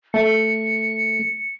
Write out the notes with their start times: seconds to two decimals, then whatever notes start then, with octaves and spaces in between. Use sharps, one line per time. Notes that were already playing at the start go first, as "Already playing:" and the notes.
0.14 A3 C#7